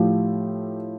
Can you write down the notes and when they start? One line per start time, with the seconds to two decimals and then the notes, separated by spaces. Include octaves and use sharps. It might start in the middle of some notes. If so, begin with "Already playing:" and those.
Already playing: A2 F3 A3 G4